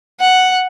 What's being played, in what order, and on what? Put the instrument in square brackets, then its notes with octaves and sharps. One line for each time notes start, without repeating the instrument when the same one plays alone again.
[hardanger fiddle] F#5